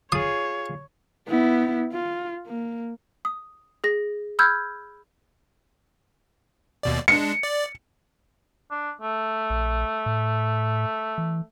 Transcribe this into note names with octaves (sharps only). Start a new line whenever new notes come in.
F4 G#4 C#5 D#6
B3 E4
F4
A#3
D#6
G#4 A#6
B5 E6 F6 G6 G#6
D#2 B2 D5
G#3 D4 C#7
D5
D4
A3
A#1
A2
E3